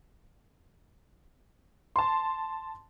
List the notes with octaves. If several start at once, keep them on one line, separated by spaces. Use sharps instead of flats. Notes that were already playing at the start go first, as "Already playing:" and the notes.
A5 C6